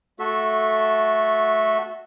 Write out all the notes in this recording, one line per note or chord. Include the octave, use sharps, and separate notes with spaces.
A3 F#4 A4 E5